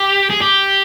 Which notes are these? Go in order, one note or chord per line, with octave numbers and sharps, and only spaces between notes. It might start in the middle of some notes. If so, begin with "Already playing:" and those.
Already playing: G4
G#4
G4